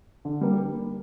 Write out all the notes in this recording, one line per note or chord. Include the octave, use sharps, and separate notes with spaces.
D3
G3 A#3